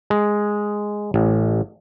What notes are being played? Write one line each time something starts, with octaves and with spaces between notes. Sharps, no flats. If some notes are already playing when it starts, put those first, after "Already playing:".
G#3
A1